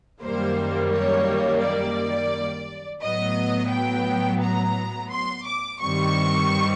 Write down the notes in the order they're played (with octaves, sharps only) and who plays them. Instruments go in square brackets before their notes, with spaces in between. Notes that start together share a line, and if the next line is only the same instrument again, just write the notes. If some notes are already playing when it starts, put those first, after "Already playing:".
[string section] F#2 D#3 G3 A#3 C5
C#5
D5
A2 F#3 B3 D#5
G5
A#5
C6
D6
G2 D#3 G3 C4 C#6